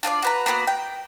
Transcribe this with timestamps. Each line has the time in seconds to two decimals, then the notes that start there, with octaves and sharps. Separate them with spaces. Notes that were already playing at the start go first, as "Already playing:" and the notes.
0.03 D4 F4 B4 D5
0.22 F#4 B4 A#5
0.46 A#3 B3 F#4 F#5
0.67 G5